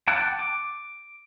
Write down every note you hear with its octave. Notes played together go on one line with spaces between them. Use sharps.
F#5 G5 A5 D6 F#6
D6